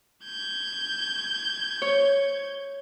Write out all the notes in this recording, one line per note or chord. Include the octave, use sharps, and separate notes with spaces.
G6 G#6
C#5